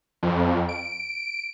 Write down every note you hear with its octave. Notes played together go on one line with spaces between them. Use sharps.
F2
D7